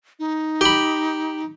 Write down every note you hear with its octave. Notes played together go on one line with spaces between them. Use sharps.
D#4
G4 B5